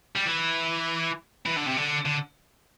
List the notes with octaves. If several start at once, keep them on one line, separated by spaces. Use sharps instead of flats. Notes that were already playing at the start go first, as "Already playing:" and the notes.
G3
E3
E3
D3
C3
D3
D3